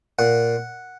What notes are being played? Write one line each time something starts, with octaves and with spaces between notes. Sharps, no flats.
A#2 F#5